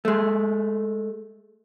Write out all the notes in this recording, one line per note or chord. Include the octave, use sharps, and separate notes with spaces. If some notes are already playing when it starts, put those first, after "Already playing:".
G#3 A3